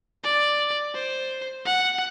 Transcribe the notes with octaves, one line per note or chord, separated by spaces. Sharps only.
D5
C5
F#5